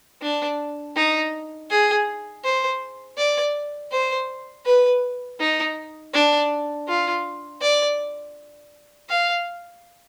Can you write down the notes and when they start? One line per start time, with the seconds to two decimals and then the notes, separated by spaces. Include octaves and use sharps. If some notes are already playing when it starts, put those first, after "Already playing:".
0.22 D4
0.96 D#4
1.70 G#4
2.44 C5
3.17 D5
3.92 C5
4.65 B4
5.39 D#4
6.13 D4
6.88 F4
7.61 D5
9.09 F5